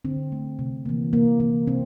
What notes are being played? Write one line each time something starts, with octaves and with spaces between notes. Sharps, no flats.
D3 C4
A3
C3
E3 A#3
C3 A#3
E3 A#3
C3 C4